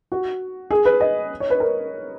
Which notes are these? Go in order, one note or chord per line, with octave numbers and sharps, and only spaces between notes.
F#4
G#4
B4
D#5
C#5
B4
A#4